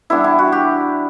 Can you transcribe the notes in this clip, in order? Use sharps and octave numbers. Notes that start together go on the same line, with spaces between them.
E3 G3 B3 D4 E4
E4
F#4
G4